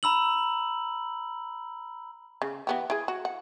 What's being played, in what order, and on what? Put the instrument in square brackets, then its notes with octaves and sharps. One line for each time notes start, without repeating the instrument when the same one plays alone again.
[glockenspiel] A#5 B5 E6 F#7
[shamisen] C#3
E3 B3 G4
E4 G#4
F#4
F#5